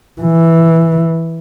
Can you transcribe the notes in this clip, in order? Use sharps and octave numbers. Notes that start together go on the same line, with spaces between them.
E3